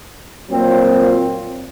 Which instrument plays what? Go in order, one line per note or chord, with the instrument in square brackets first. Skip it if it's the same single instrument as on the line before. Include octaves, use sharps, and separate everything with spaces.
[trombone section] A#2 F#3 C4 F4